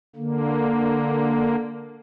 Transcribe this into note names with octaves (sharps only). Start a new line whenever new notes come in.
D3 A#3